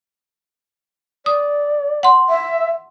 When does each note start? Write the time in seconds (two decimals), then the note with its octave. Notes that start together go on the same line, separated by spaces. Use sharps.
1.26 D5 D#6
2.03 F#5 C6
2.29 E5